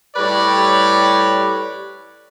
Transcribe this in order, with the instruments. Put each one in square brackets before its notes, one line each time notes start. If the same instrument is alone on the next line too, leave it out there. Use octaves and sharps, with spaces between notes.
[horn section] A2 G3 G4 B4 C#5 D5